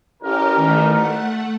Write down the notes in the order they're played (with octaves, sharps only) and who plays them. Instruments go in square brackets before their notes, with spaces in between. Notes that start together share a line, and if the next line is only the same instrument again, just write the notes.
[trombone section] A1 A#4 [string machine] C#4 G4
[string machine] D#3 A3 D#4
A3 F#5